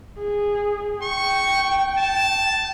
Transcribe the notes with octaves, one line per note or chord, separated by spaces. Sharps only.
G#4
G5 C#6
A5